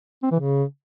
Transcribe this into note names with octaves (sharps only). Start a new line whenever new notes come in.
C4
E3
C#3